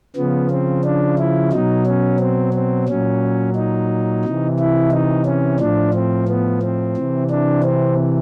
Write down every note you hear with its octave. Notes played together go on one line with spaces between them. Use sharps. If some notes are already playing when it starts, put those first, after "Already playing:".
C#3 F3 B3
C4
D4
E4
B2 F#3 D#4
C#4
C4
C4
A#2 F#3 C#4
D#4
C3 E3
E4
D#4
C#4
A2 F3 D4
C4
B3
C4
C3 E3
D4
C4